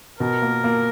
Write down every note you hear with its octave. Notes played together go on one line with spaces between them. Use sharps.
B2 A#4
A#3
A#3